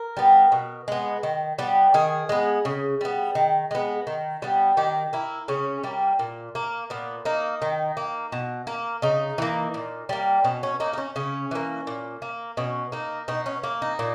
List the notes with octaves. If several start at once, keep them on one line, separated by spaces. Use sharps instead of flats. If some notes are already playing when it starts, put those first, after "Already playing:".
Already playing: A#4
G3 B3
B2
G#3 B3
D#3
G3 B3
D#3 G#4
G#3 B3
C#3
G3 B3
D#3
G#3 B3
D#3
G3 B3
D#3 G4
A#3 E4
C#3 C#4
G3 A#3
A#2
A#3
A#2 B3
A#3 D#4
D#3
A#3
B2
A#3
C#3 D#4
E3 A#3
A#2
G3 A#3
B2 C#4
C#4
A#3 D#4
D#4
C#4
C#3 C#4
E3 A#3
A#2
A#3
B2 C#4
A#3 D#4
B2 D#4
C#4
A#3
D#4
A#2